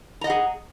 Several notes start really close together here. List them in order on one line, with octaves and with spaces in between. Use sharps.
A#5 D#5 F#5 G#4